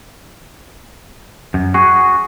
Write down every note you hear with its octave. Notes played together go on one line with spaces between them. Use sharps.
F#2
F#4 G#4 C#6